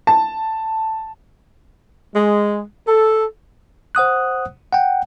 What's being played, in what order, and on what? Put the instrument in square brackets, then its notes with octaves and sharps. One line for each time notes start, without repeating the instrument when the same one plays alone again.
[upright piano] A5
[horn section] G#3
A4
[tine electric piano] C5 F#5 D#6 F#6
F#5 G5